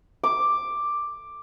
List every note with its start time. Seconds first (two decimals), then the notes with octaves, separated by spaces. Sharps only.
0.24 D6